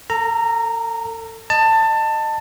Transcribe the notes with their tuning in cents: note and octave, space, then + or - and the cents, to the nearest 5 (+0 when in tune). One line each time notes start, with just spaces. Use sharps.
A4 +35 A#5 -10
D#5 -10 A5 +20